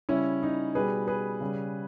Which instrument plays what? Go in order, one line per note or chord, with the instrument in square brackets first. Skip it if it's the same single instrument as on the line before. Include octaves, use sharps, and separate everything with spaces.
[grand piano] C#3 G3 C#4 E4
D#4
B2 G3 G#4 B4
G#4 B4
C#3 G3